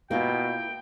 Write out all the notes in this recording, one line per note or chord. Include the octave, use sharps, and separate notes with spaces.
B2 A#3 E4 F4 G5